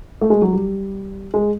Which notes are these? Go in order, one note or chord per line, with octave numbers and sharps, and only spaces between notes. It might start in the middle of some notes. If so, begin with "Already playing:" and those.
A3
G#3
F#3
G3
G#3